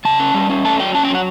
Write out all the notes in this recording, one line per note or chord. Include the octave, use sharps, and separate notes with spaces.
C#3 A5
C#4
G3
C#4
A3 A5
F#3 G5
C#4 A5
G5
F#3 F#5